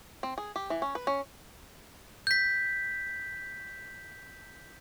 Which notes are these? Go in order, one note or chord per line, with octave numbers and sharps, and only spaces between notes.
C4
G#4
G4
E3
C#4
B4
C#4
G6 B6